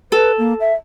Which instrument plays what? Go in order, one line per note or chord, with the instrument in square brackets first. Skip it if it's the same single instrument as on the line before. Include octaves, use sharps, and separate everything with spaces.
[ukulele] A4 [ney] B4
[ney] A#3
E5